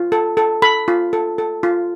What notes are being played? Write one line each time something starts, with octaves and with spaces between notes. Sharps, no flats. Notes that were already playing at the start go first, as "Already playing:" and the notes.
Already playing: F4
A4
A4
A4 B5
F4
A4
A4
F4